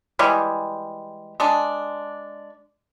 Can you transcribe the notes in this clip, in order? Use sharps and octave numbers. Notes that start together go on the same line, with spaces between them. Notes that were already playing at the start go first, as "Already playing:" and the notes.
E3 G3 G#3
G#3 D4